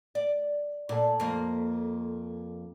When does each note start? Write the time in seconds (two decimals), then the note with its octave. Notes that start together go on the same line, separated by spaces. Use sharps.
0.15 D5
0.89 A#2 A4 D5
1.20 F2 A#3